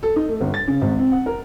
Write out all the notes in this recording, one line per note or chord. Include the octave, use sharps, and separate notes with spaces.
A4
D#4
A3
G1
A6
C#3
G#1
C4
F#5
A#4